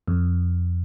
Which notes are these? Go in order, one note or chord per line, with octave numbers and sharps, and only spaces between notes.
F2